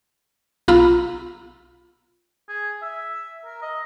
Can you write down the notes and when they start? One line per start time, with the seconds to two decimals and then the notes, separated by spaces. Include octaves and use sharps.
0.68 B1 F4 A#5 B5 E6
2.49 G#4
2.82 E5
3.45 A#4
3.62 D#5